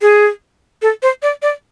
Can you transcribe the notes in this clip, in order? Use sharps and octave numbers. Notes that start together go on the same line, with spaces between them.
G#4
A4
C5
D5
D5